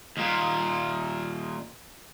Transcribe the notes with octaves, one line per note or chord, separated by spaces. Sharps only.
D#2 A#2